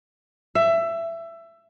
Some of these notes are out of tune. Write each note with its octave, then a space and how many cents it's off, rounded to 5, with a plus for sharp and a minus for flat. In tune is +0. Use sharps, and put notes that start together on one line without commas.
E5 +20